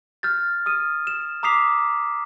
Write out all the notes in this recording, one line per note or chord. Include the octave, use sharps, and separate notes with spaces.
F6 G6 A6
D#6 F6 D#7
E7
A#5 D6 D#6 B6 C7 F7